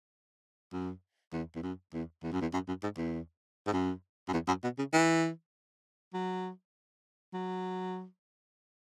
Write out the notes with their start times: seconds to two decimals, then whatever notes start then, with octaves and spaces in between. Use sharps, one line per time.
0.72 F#2
1.33 E2
1.55 E2
1.63 F#2
1.93 E2
2.23 E2
2.32 F#2
2.41 E2
2.53 F#2
2.68 F#2
2.83 G#2
2.97 E2
3.67 G#2
3.73 F#2
4.28 F#2
4.33 E2
4.47 F#2
4.63 B2
4.78 C#3
4.93 E3
6.14 F#3
7.33 F#3